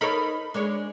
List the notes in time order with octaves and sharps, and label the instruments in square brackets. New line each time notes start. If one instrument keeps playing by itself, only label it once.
[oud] D#4 A4 C#5 [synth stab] A#4 B5
[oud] G#3 D4 C#5